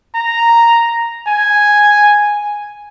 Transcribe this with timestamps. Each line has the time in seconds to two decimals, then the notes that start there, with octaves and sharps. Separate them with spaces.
0.15 A#5
1.27 G#5